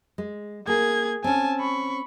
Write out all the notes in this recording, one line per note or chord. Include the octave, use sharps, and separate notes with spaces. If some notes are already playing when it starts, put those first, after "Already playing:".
G#3
A#3 G#4 G#6
C4 C#4 G#5 A5
B5 C#6